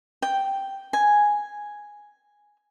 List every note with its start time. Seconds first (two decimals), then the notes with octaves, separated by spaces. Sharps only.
0.22 G5
0.93 G#5